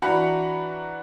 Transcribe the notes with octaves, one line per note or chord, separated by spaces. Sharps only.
E3 D4 F#4 A#5 B5 C#7